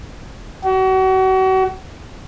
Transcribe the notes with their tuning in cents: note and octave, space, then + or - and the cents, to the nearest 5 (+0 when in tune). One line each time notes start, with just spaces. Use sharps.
F#4 +35